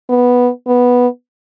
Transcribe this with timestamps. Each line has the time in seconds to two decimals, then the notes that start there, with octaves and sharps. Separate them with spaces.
0.09 B3
0.67 B3